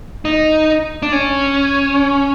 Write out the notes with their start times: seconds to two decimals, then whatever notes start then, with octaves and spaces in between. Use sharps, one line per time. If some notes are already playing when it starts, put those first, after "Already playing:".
0.25 D#4
1.03 D4
1.12 C#4